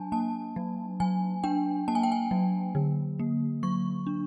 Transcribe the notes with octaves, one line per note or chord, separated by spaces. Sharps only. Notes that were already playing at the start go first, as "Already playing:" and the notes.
Already playing: F#3 D4 G#5 A5
A#3 A5
F#3
F#3 G#5
D4 G5
A#3 A5
G#5
G5
G#5
F#3
D3
A#3
F#3 C#6
D4